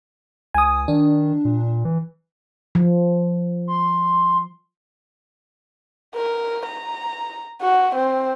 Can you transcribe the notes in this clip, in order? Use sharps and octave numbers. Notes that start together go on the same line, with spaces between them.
C#2 G#5 D#6
D#3 D4
A#2
E3
F3
C6
A#4
A#5
F#4
C4